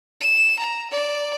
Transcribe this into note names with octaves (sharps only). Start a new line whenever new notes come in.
E7
A#5
D5